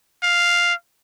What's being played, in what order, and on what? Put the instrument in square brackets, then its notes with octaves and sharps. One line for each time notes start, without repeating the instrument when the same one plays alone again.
[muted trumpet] F5